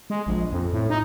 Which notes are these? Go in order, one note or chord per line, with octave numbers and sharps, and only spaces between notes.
G#3
A#1
F2
A2
D#4